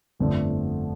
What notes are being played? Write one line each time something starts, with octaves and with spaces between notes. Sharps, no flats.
G1 F2 D3 F3 A3